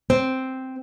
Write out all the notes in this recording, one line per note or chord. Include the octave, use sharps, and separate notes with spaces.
C4